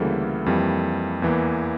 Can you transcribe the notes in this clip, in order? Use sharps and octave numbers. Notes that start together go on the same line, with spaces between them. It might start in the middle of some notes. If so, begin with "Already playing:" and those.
Already playing: D2 C#3 E3 G3 A#3 A4
F2 E3 G3 A#3
E2 E3 A#3